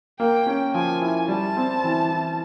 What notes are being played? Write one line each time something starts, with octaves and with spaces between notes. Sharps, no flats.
A#3 G5
C#4
F3 G#5
E4
G3 A5
C4
E3
E4